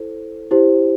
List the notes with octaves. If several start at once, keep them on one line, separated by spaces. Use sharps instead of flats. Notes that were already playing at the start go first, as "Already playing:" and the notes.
Already playing: E4 A4 C5
E4 G4 C5